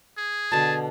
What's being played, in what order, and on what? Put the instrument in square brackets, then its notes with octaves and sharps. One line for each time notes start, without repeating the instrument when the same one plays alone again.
[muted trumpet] G#4
[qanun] B2 D3 [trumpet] A5